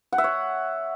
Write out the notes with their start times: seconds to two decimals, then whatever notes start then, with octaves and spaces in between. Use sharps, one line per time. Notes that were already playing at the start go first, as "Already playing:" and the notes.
0.13 F#5
0.18 E5
0.24 C#5